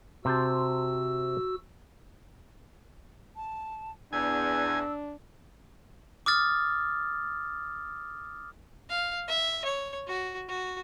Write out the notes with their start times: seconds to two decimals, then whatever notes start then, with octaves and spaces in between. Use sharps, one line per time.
0.25 C3 F#4 C5 A5 E6
3.36 A5
4.13 E2 D4 G#5 E6
6.26 D6 D#6 F6 A6
8.89 F5
9.28 E5
9.64 C#5
10.07 F#4
10.48 F#4